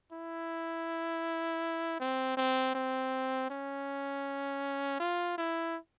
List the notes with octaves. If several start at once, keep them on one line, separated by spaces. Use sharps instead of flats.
E4
C4
C4
C4
C#4
F4
E4